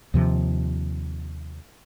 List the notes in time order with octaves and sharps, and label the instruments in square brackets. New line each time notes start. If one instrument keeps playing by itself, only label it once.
[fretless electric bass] D#2 C3 F3